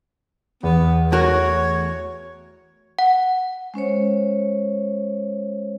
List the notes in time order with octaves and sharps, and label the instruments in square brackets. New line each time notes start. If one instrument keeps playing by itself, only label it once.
[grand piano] E2 [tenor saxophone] B3
[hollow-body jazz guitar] A3 F#4 A#4 [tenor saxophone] C#5
[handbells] F#5
[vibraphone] G#3 C#4 C5 C#5